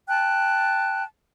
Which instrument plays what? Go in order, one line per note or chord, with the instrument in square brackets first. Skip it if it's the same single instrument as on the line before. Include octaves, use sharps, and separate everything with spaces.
[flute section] G5 A5 F#6